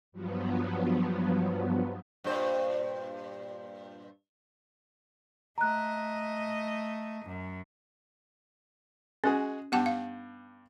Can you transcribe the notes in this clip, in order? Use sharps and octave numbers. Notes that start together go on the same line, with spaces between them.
G2 F3 F#3 B3
G2 A#2 C5
A3 D#5 A#5 F#6
F#2
G#3 C#4 F#4 G#4
G2 B3 G4 F#5 A5
F5